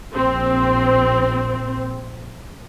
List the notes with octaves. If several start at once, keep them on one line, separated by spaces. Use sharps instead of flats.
A#1 C4